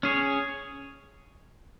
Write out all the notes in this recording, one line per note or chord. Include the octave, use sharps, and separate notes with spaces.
C#4 G#4 C#5